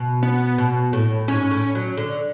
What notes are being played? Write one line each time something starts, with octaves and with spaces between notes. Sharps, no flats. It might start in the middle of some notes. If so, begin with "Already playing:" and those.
Already playing: B2
B3
B2
A2
G#2 C#4
A2
F#3
D3